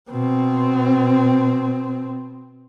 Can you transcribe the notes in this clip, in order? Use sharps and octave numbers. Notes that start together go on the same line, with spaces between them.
B2 C4